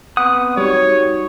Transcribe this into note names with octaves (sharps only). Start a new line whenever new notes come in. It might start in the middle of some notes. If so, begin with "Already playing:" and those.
B3 C4 B4 F#5 D#6
G3 D#4 F#4 C#5